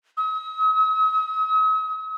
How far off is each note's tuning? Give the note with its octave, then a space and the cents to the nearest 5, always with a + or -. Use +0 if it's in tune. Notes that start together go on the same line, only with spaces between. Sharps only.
D#6 +45